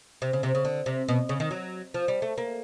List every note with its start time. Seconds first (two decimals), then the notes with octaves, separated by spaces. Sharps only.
0.22 C3
0.33 C#3
0.43 C3
0.55 C#3
0.65 D3
0.86 C3
1.08 B2
1.29 C#3
1.40 D#3
1.51 F#3
1.94 F3
2.08 G3
2.22 A3
2.38 A#3